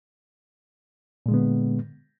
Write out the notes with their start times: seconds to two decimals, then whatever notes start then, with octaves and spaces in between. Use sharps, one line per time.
1.26 A#2
1.28 G#3
1.31 D3
1.34 B3